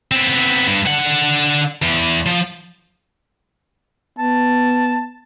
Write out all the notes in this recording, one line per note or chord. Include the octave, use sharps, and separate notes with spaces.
B3 C4
G2
D3 F#5
E2
F3
B3 A5